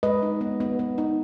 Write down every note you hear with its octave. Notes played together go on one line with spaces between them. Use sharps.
G#3 B4 D#5
D#4
B3
B3
B3
D#4